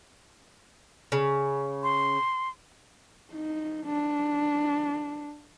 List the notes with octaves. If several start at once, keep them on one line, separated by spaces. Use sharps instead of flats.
C#3
C6
D#4
D4